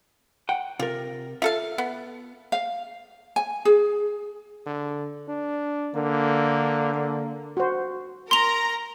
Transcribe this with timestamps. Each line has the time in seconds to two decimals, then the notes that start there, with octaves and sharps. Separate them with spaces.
0.49 F#5 G5
0.79 C3 F4 A#4
1.42 F4 A4 E5 F5
1.78 B3
2.52 F5
3.36 G#5
3.65 G#4
4.66 D3
5.28 D4
5.95 D3 A#3
6.94 A#3
7.57 F#4 C5
8.31 A#4 A#5 C6 F7